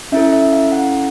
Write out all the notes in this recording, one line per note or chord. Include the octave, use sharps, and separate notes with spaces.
C#4 E4 A4 E5
E5
F5
F#5